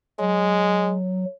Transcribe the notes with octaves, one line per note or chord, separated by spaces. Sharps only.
F#3 G#3